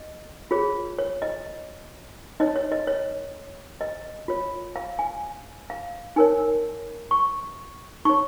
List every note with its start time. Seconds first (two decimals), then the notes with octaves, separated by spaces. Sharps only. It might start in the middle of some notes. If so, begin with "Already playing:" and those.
Already playing: D#5
0.51 F4 G#4 C#5
0.99 C#5
1.22 D#5
2.40 D#4 C#5 D#5
2.56 C#5
2.72 D#5
2.87 C#5
3.81 D#5
4.28 F4 C#5
4.76 F5
4.99 G#5
5.70 F5
6.16 D#4 A#4 C#5 G#5
7.11 C#6
8.05 D#4 C#5 C#6